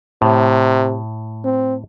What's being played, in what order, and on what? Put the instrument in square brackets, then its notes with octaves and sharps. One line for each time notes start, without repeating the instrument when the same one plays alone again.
[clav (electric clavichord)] A2 [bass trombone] C3
[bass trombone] C4